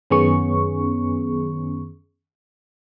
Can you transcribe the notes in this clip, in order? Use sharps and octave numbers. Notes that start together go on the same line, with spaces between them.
F#2 D#3 B3 C#4 G#4 C#6